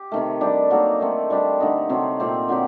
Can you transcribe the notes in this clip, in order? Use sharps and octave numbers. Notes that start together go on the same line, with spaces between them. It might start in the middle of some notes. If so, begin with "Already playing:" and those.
Already playing: G4
C3 D#3 A3
G3 D4 G4
F#3 A#3 D#4 A4
D#3 A3 C4
G3 D4 G4
D3 A3 D#4
C3 F#3 C4 G4
A#2 A3 C4 G4
D3 F#3 C4 G4